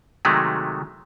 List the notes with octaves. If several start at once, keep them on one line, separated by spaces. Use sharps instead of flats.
C3 D#3 F#3 G#3 A3